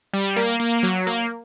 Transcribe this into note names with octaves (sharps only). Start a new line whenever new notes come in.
G3
A#3
A#3
F#3
A#3